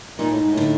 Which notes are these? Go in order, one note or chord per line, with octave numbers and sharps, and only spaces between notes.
A#2 D#4
A2
G#2
A2
D3